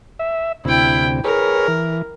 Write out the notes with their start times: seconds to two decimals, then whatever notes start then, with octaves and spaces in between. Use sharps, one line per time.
0.19 E5
0.65 D2 C3 E4 G5
1.24 G#4 A#4 B4 C#5
1.68 E3